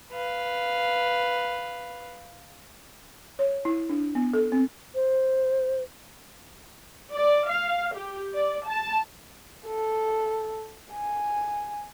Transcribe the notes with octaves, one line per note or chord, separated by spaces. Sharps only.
B4 F5
C#5
E4
D4
B3
A4
C4
C5
D5
F5
G4
D5
A5
A4
G#5